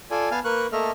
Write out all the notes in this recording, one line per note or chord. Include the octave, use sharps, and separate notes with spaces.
F4 A4 D5 G#5
B3 F5 G#5 A5 F6
A#3 A#4 B4 C#6 F#6
A3 A#3 A4 D#5 E5 F6